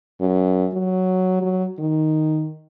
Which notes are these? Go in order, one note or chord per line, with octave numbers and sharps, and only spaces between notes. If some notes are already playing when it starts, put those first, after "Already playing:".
F#2
F#3
F#3
D#3